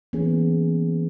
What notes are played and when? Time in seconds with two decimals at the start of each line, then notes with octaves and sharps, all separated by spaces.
0.13 E3 A#3 B3 C#4 G#4